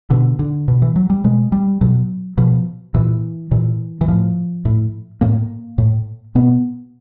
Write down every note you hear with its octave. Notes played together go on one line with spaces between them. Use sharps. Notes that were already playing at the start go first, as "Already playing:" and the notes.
B2 D3
D3
B2
E3
F#3
G3
B2 G#3
G3
B2 F#3
B2 F3
A#2 E3
A#2 E3
E3
A2 F3
A2
A2 A#3
A2
B2 B3